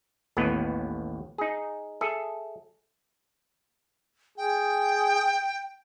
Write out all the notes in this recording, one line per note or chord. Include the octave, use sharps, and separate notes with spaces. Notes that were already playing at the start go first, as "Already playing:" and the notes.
A1 D#2 A2 B3 B4
D#4 G#4
G#4 A4 E5
G#4 G5